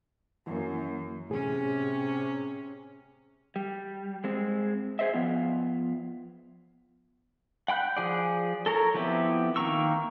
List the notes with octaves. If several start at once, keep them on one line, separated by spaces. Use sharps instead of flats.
F#2 E3 A#3
A2 C3 C#4 G#4
G3
G#3 C4
G#4 C5 D#5 E5
F3 B3 F4
F#5 G5 B5 F#6 G6
F3 G#4 D5
A4 A#4 C#5 A#5
F3 B3 C4 E4 G4
D#3 A#3 A#5 C#6 E6